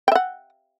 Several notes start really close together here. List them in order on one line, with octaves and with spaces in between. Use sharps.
G5 E5 F#5